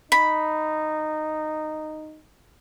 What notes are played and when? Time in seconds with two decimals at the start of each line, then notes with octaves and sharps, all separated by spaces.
0.12 D#4 B5